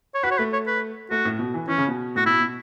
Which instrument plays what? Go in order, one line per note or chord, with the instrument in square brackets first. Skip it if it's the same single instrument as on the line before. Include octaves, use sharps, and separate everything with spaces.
[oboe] C#5
[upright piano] F#4 [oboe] B4
[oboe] C#5
[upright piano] A3 [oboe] B4
[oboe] C#5
B4
[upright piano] A3 [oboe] F#4
[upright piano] A2
B2
E3
[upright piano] E3 [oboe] C#4
[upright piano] C#3
B2
[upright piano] A2 [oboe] F#4
[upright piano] B2 [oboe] E4
[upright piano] B2